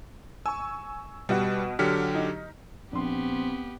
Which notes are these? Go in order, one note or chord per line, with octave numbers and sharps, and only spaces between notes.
G#5 C#6 E6
B2 G3 F#4
D3 F#3 G4 F6 B6 C#7
D#4
A#1 B3 C4 G4 C6